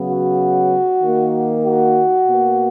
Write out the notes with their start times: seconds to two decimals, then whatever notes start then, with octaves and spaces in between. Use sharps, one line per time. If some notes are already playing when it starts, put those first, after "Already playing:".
Already playing: C#3 F#3 B3
0.09 F#4
1.02 D#3 A#3
1.64 F#4
2.27 B2 A#3